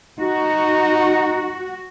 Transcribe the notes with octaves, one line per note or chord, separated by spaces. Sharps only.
D#4 F#4